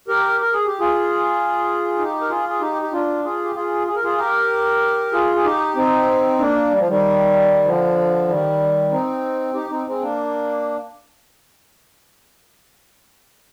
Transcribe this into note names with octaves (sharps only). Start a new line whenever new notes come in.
G4 A#4
A#4
G#4
G4
F4 G#4
D#4 G4
A#4
F4 G#4
G#4
D#4 G4
G4
D4 F4
F4 G#4
G4
F4 G#4
G#4
A#4
F4 G#4
G4 A#4
F4 G#4
G#4
D#4 G4
C4 D#4
A#3 D4
G3
F3
D#3 G3
D3 F3
D#3 G3
C4 D#4
D#4 G4
C4 D#4
G#3 C4
A#3 D4